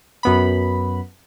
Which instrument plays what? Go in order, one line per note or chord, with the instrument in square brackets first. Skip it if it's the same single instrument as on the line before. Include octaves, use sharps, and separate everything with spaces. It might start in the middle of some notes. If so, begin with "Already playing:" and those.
[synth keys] F#2 B3 B5